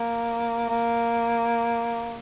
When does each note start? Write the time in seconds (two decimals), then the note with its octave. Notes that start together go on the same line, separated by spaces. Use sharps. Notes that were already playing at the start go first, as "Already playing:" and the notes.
Already playing: A#3
0.69 A#3